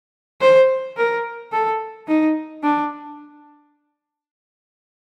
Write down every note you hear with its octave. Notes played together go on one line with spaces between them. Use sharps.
C5
A#4
A4
D#4
D4